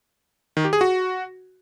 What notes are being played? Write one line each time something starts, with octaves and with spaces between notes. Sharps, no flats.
D#3
G4
G#4
F#4